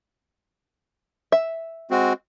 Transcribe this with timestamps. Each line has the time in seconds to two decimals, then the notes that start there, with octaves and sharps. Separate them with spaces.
1.32 E5
1.91 G#3 C4 F#4